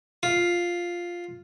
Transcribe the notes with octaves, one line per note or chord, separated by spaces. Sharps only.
F4